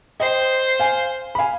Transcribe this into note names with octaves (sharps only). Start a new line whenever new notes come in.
C5 D#5 G5
F5 G#5
B5
F5 G#5